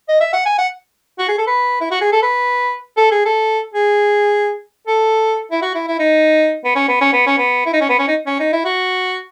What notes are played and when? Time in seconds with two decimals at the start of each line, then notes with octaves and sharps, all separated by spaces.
0.09 D#5
0.20 E5
0.33 F#5
0.45 G#5
0.58 F#5
1.19 F#4
1.28 G#4
1.38 A4
1.47 B4
1.81 E4
1.91 F#4
2.01 G#4
2.12 A4
2.22 B4
2.97 A4
3.11 G#4
3.26 A4
3.74 G#4
4.87 A4
5.51 E4
5.62 F#4
5.75 E4
5.87 E4
6.00 D#4
6.65 B3
6.75 C#4
6.88 B3
7.01 C#4
7.13 B3
7.27 C#4
7.38 B3
7.66 E4
7.73 D#4
7.81 C#4
7.89 B3
7.99 C#4
8.08 D#4
8.26 C#4
8.40 D#4
8.53 E4
8.65 F#4